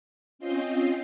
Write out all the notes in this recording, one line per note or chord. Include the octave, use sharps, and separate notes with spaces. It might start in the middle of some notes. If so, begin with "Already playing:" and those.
C4 C#4 F4 D#5 G6 C7